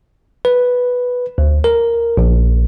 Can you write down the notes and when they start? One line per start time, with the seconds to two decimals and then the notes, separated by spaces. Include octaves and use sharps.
0.45 B4
1.38 D2
1.64 A#4
2.17 A#1